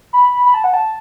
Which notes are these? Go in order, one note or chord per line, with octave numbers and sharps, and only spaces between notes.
B5
B5
A5
F#5
A5